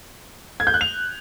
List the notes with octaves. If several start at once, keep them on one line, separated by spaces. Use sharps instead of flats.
G#6
G6
F#6
F7